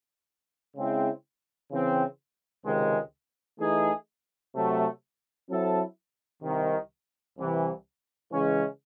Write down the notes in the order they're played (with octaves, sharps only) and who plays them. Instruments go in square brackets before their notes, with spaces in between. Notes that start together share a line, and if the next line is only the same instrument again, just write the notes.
[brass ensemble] C#3 G#3 C4 E4
C#3 E3 C4
C#2 C3 D#3 G#3
E3 A3 D#4 G#4
C3 F#3 A3
F#3 C4 E4 A4
C2 C3 D#3
C2 C3 E3
C#3 E3 G#3 C#4